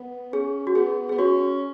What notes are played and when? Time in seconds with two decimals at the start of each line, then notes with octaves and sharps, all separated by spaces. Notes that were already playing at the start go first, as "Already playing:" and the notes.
Already playing: B3
0.33 C#4 G#4
0.67 F#4
0.75 B3 G#4
1.09 B3 G#4
1.18 C#4 F#4